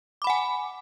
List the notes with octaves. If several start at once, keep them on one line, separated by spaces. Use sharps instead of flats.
F#5 G#5 B5 D6